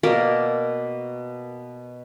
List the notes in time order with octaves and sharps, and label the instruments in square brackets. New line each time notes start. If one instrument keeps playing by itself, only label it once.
[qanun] B2 A#3 A#4 D5